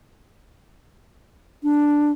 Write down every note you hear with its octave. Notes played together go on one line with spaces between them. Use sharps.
D4